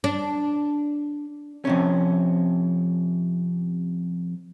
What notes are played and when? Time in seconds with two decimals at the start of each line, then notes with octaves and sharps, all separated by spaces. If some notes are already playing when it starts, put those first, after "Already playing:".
0.04 D4
1.65 F2 C3 C#4